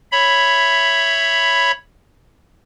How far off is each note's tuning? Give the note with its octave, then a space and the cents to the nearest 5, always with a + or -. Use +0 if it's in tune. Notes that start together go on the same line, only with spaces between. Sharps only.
C#5 +0 E5 +5 B5 +0